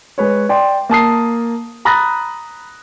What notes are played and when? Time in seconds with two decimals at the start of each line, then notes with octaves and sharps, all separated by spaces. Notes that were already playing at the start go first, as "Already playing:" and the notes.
0.18 G#3 B4 C#5
0.49 D5 G5 C6
0.89 A#3 A5 D#6 C7
1.85 A#5 B5 D#6 F#6 A6 A#6